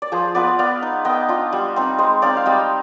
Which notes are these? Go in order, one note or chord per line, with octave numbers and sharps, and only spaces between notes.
D5
F3 G#4 C5
B3 F4 B4 D5
B3 D5 F5
D#4
B3 D#5 G5
D4 F4
G3
C4 D#4
G#3 C5 D#5
C4 D#4 D5 F5
F5
G3 D#5 G5